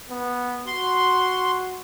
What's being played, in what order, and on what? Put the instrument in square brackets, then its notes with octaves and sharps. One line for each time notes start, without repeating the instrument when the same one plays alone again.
[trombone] B3
[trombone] F#4 [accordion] C6